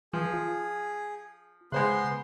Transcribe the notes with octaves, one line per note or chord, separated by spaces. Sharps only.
E3 F3 G#4
F4
C#3 G#3 B3 C5 C6 F#6